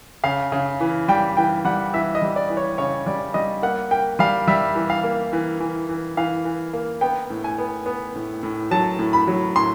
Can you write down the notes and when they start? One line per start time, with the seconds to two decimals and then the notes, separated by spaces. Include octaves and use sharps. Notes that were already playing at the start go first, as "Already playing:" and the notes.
0.24 C#3 F5
0.52 C#3
0.81 E3
1.08 G3 G5
1.37 E3 G5
1.65 G3 F#5
1.94 E3 E5
2.15 D#5
2.22 G3
2.36 D5
2.50 E3
2.57 C#5
2.78 C#3 C#5
3.06 G3 D5
3.34 G3 D#5
3.62 A#3 F#5
3.91 A#3 G5
4.19 G3 F5
4.48 G3 E5
4.75 E3
4.90 F5
5.04 A#3
5.33 E3
5.60 E3
5.89 E3
6.17 E3 F5
6.45 E3
6.73 A#3
7.01 B3 G5
7.30 A2
7.44 G#5
7.58 B3
7.86 B3
8.15 A2
8.43 A2
8.71 F#3 A5
8.99 A2
9.13 B5
9.28 F#3
9.56 A2 C6